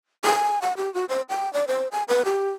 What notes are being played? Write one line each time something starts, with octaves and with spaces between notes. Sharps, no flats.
G#5
F#5
G4
F#4
C5
G5
D5
C5
G#5
B4
G4